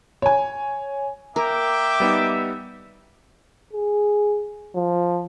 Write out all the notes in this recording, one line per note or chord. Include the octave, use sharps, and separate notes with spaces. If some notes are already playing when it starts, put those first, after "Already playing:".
C#5 G#5
A#3 A#4 E5 G5 D6
G3 B3 D#4
G#4
F3